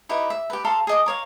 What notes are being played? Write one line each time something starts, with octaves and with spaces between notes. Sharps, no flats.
D#4 E4 G4 B4
E5
G4 B4
A4 F5 A#5 C6
G#4 D#5 D6
A#4 C#5 F5